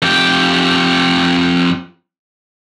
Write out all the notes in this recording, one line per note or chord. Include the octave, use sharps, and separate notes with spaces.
F2 G4